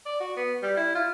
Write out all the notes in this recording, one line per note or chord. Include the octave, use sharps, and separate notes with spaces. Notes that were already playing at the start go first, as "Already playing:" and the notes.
D5
F#4
B3
G3
E4
F4